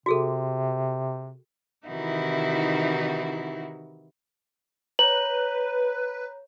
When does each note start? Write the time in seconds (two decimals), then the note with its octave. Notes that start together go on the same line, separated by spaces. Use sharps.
0.06 C3 F#4 G#4 A4
1.88 C3 D#3 E3 D#4 E4 F#4
4.99 B4 C#5 A#5 F#7